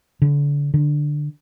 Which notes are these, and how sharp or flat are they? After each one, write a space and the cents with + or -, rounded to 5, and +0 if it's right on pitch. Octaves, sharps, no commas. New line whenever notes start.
D3 -30
D3 +10